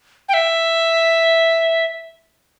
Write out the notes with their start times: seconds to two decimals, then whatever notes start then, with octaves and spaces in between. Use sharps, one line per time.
0.29 G5
0.34 E5